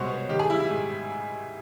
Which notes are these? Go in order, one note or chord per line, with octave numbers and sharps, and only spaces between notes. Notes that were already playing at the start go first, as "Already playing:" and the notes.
Already playing: C2 B2 G#3 F#4 C5 C#5
B3
D#3 G4
G#4
G3 E4
E4
G#2